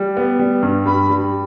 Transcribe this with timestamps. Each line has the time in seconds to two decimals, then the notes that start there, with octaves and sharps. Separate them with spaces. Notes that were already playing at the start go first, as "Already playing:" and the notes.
Already playing: G3
0.17 B3
0.39 G3
0.62 G2
0.86 G2 B5
1.10 G3